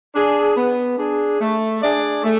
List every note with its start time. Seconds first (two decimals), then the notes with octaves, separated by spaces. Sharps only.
0.14 D4 G#4
0.56 B3
0.98 D4 G#4
1.40 A3
1.82 D4 G#4 D5
2.23 A3